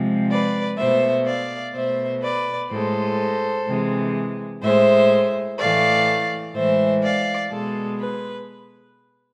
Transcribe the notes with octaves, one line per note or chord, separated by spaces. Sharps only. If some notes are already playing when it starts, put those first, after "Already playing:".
Already playing: C3 F3 G#3
B4 D5
B2 A3 C5 E5
D5 F5
B2 A3 C5 E5
B4 D5
A2 G#3 A4 C5
C3 E3 G#3
A2 G#3 C5 E5
A2 E3 A3 D5 F5
A2 E3 G#3 C5 E5
D5 F5
B2 G#3 A4
B4